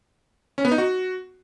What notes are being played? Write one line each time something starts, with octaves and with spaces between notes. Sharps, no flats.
C#4
B3
D#4
F#4